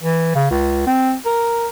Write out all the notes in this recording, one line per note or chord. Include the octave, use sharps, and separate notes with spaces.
E3
C#3
C#2
C4
A#4